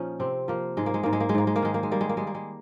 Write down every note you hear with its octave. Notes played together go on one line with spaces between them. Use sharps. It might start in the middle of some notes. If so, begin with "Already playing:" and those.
Already playing: A#2 F3 C#4 D#4
C3 C4
F3 A#3
G#2 G#3
A#3
G#3
G#2 A#3
G#3
A#3
G#3
G#2 A#3
G#3
A#3
D#3 G#3
A#3
G#3
G3 A#3
G#3
A#3
G3 G#3
A#3
G#3